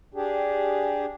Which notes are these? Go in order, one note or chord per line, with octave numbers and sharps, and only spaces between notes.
D4 G4 G#4